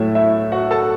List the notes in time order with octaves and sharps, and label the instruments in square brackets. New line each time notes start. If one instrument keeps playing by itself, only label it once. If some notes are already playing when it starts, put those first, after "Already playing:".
Already playing: [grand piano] A2 F#3 A3 E4 E5
E4 E5
F#4 F#5
A4 A5